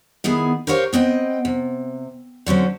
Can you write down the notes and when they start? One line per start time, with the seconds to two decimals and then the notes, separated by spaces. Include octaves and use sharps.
0.24 D#3 B3 E4 G#4
0.67 G4 A#4 C5 C#5 D#5 F5
0.93 B3 C4 D#5 G5
1.45 C3
2.46 D3 F#3 C4 C#4